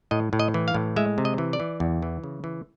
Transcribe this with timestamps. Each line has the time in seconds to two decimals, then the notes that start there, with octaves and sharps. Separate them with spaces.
0.11 A2 D#5
0.33 A2
0.39 D#5
0.54 E3
0.68 F5
0.74 A2
0.96 G#3 E5
1.18 C3
1.25 D#5
1.38 E3
1.53 D5
1.60 E3
1.80 E2
2.02 E3
2.24 C#3
2.44 E3